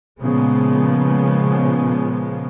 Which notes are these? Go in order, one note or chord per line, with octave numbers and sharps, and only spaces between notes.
A#2 C#3 F3 G#3 B3